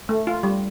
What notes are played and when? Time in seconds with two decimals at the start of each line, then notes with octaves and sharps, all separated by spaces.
0.09 A3
0.27 F4
0.43 G3